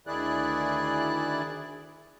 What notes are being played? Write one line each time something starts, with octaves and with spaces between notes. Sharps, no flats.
D2 D#3 E4 G#4 D5 F#6